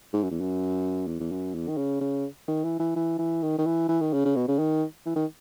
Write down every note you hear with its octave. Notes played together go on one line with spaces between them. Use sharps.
G#2
F#2
E2
F#2
E2
E2
F#2
E2
D#3
C#3
C#3
D#3
E3
E3
E3
E3
D#3
D#3
E3
E3
D#3
C#3
C#3
B2
C#3
D#3
E3
D#3